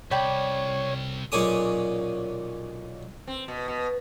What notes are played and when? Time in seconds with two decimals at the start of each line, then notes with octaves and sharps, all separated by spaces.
0.11 C2 C#5 D5 G5 B5
1.32 B1 A#2 C#4 G#4 D6 D#6
3.27 C4
3.48 B2
3.68 B2